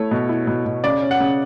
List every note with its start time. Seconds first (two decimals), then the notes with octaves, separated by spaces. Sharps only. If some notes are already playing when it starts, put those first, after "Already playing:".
Already playing: A3 E4 C#5
0.11 B2
0.29 E4
0.47 B2
0.66 B2
0.84 C#3 D5
1.02 C#4
1.11 F#5
1.20 C#3